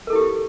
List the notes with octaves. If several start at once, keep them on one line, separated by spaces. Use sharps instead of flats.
E4 G4 A4 A#4